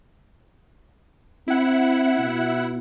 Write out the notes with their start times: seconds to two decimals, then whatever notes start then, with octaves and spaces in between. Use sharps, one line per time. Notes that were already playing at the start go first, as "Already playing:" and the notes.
1.48 C4 E4 F#5
2.19 B2